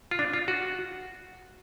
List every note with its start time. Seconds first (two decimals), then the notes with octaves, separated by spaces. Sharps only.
0.11 F4
0.19 D4
0.34 F4
0.48 F#4